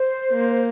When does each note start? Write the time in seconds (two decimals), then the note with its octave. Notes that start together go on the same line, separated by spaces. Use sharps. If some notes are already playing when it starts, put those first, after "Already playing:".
Already playing: C5
0.32 A#3